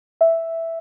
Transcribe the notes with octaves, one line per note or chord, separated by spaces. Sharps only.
E5